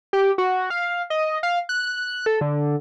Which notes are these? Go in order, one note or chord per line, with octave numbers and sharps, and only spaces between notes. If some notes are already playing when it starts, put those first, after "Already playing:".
G4
F#4
F5
D#5
F5
F#6
A4
D3